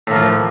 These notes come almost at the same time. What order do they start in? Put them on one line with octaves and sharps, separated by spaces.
A2 A#3 F3